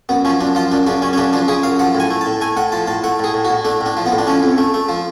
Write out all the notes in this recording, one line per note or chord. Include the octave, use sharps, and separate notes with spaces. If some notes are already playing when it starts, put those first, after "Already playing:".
F#2 B3
F3 C#4
F#2 D4
F3 F4
F#2 D4
C#3 D4
F#2 C#4
C#4
C#3 D4
F3 D4
C#3 G#4
F#2 F5
F3 F#5
A2
G#5
A3
A5
A2
A3 G#5
A2 F#5
F3 A5
A2 A5
A3 F#5
A2 G#4
A2
F#4
A2
A3 D4
A2 D4
F3
B3
A2
D4
F3 C#4
F2
A3
A3
F3